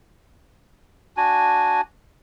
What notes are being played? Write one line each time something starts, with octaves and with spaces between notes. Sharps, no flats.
D4 F#4 G#5